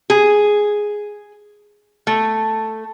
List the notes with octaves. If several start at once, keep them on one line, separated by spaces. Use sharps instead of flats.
G#4
A3